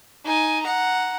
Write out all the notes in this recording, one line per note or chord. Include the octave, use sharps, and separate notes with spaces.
D#4 G#5
F#5 A#5